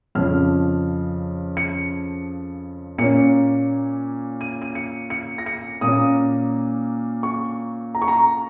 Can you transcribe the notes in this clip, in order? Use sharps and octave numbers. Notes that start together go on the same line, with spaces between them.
F2 C#3 F3 C#4 F6
C#7
A#2 A#3 C#4 C#7
D#7
D#7
C#7
C#7
A#6
C#7
A#2 A#3 C#4 D#6
C#6
A#5
C#6
A#5